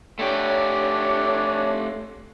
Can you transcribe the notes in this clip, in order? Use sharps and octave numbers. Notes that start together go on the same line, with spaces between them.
A3 D4 G4 C#5